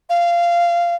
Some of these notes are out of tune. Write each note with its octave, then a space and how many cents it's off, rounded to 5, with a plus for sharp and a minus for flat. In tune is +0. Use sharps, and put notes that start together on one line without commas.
F5 -15